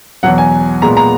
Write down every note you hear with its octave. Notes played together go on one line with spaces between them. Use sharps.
E2 B2 F#3 F#5
G#5
A#2 G#3 B3 A#5
A#5